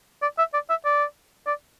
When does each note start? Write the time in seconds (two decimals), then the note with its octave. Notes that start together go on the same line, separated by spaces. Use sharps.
0.22 D5
0.38 E5
0.54 D5
0.70 E5
0.85 D5
1.47 D5